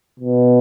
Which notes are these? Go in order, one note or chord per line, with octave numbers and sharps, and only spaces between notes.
B2